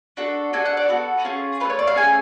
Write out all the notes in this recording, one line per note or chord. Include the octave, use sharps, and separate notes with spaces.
D4 F#4 A4
D4 F#4 A4 G#5
F#5
D5
B3 F#4 A4
C#4 F4 G#4
A3 C#4 F4 B4
C#5
D5
F5
A3 C#4 G#4 G#5